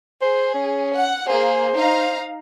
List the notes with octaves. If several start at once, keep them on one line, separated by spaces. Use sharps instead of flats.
G#4 C5
C#4
F#5
A#3 G#4 C5
D#4 F5 A#5